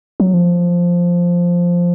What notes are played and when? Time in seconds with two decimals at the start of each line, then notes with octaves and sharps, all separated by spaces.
0.20 F#3
0.34 F3